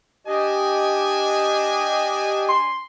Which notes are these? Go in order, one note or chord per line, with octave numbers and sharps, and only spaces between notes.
D4 G4 D#5 G#5
C6